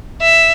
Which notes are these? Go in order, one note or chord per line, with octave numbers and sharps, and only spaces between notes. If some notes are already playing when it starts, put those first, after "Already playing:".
E5